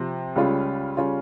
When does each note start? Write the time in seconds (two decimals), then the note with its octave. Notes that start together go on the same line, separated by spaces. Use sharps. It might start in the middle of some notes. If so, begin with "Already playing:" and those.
Already playing: C3 F3 C4
0.36 C#2 C#3 G3 C#4 F4
0.97 C#3 G3 C#4 F4